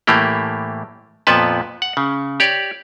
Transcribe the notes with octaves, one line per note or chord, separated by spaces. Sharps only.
A2 E3 A3 A#3 G4
F2 A#2 F3 B3 B4 A5
F#5
C#3
G4 C#5 D5